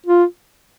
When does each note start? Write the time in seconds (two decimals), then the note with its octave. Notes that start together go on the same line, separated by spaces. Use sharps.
0.06 F4